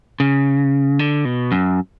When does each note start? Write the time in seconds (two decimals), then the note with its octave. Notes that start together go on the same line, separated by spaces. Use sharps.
0.20 C#3
0.99 D3
1.25 B2
1.52 F#2